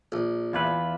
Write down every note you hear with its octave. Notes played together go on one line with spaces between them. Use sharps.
A#1
E2 F4 B4 D5 E5